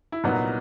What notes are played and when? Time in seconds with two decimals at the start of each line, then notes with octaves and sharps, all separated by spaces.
0.12 E4
0.24 C2 A#2 F#3 B3 D#4